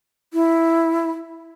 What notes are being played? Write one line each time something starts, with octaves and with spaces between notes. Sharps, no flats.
E4